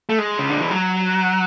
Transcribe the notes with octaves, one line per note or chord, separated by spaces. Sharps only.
A3
G#3
C#3
D3
E3
F#3